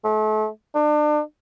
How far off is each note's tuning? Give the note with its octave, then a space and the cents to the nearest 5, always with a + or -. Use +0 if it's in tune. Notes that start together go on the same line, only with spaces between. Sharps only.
A3 -35
D4 +35